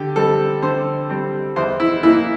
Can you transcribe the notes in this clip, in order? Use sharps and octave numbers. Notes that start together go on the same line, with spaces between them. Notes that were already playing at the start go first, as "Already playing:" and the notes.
Already playing: D3 G4
G3 C4 A4
D3 C5
G3 C4
E2 C5
E4
E3 A#3 E4